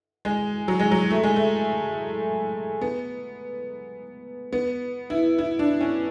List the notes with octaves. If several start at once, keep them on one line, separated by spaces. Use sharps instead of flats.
G#3
F#3
G#3
F#3
A3
G#3
A3
B3
B3
E4
E4
D4
C#4